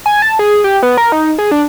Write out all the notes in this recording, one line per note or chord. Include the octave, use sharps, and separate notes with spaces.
G#5
A5
G#4
G4
B3
A#4
D#4
G#4
D4